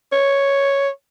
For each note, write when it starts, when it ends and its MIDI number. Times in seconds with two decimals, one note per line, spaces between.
0.12 0.89 73